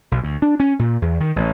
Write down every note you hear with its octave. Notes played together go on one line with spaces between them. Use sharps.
B1
D2
D4
C#4
A#2
E2
D#3
A1